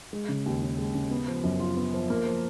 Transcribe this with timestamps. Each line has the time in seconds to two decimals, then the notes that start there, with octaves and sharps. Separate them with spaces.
0.13 G#3
0.29 C#3
0.46 D#2
0.62 C#4
0.79 G#3
0.94 C#3
1.11 B3
1.28 F3
1.44 F#2
1.60 F4
1.77 B3
1.94 F3
2.10 A#3
2.26 F3